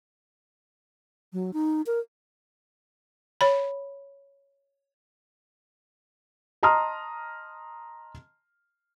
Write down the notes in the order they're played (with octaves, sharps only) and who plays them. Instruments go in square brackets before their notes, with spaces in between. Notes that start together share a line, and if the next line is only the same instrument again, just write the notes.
[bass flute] F#3
D#4
A#4
[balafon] C#5 B5
[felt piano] D#5 A5 A#5 C6 D#6 F6